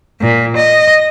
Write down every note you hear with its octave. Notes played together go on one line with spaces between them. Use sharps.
A#2
D#5